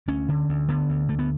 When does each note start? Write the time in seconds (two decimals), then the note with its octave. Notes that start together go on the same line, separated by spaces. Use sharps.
0.08 D2 C#4
0.29 D3
0.49 D2
0.68 D3 B3
0.89 D2
1.09 D3 A3
1.19 B3